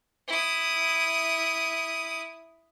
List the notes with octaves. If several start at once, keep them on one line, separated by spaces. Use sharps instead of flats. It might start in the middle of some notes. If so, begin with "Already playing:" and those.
E4 D#6